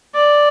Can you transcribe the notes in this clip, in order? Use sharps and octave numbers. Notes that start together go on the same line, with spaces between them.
D5